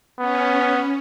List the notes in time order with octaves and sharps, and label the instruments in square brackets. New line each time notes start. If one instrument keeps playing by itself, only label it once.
[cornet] B3 [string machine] C#4